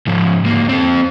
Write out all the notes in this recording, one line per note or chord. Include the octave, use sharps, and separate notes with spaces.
G#2 F3
D2 A#3
C4 A4